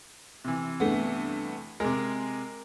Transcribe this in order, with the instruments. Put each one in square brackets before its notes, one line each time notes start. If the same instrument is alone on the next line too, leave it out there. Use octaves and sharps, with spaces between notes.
[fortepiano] C3 E3
[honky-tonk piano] G2 A3 B3
[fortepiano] C3 G#3 [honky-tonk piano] A#4